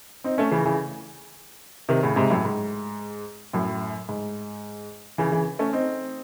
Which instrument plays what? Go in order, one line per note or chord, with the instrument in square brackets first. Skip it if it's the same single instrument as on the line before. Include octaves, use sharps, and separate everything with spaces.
[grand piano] C4 D#4
A3 C#4
C#3 E3
C#3 E3
C3 D#3
A2 C#3
G#2 C3
F#2 A2
G#2
F#2 A2
G#2
C#3 E3
C#3 E3
A3 C#4
C4 D#4